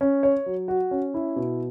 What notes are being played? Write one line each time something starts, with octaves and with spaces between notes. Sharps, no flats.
C#4
C#5
F#3
F#4
C#4
E4
B2